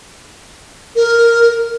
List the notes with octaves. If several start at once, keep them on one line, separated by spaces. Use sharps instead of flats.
A#4